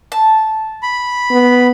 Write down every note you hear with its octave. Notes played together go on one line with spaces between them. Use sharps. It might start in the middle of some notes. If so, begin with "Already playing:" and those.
A5
B5
B3